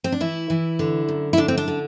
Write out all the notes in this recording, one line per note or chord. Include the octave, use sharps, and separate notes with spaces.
C4
D4
E3 E4
E3
D3
F#2
E4
D3 D4
C4
D4
D3